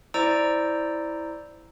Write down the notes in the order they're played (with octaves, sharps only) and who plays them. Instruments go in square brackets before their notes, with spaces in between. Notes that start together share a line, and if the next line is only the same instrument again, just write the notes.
[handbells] E4 C5 D5 A#5 E6 D7